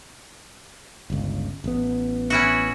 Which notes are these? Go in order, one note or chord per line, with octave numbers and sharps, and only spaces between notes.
G1 C#2
A1 B3
C#4 E4 F#4